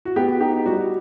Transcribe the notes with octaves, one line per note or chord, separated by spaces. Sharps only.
F#4
B3 G4
D#4 G4
G3 F#4